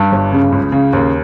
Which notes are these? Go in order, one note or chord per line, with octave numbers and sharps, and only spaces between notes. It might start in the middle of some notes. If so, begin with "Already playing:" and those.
Already playing: G2
G1
C#3
C#2
C#3
D#2